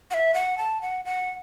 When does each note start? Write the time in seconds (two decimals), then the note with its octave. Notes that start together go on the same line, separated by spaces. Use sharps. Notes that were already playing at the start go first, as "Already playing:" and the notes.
0.11 F#5
0.14 E5
0.34 F#5
0.58 A5
0.81 F#5
1.05 F#5